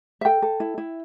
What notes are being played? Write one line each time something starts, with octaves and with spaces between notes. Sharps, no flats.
E5
A4 G5
A4
E4
E4